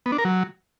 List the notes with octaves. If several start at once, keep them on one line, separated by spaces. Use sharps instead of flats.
B3
D4
A#4
F#3